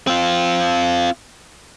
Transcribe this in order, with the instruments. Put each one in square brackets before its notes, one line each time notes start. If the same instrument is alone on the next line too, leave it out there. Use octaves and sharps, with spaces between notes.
[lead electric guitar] C4 F4